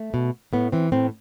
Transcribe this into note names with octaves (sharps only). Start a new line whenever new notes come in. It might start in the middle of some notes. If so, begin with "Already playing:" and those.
Already playing: A3
B2
A2 B3
E3 C4
A2 C4